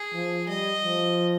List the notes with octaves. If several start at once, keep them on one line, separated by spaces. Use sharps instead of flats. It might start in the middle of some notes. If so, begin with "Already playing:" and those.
Already playing: G#4
F3
G3 D#5
F3